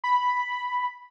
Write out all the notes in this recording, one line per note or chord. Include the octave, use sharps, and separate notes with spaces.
B5